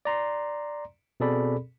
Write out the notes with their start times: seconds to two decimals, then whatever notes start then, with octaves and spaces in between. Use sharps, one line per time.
0.05 D5 A#5 C6
1.20 B2 C4 G#4 A4 D5 B5